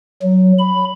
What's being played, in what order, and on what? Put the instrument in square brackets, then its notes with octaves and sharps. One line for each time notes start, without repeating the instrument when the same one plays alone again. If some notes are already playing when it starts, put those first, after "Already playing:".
[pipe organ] F#3
B5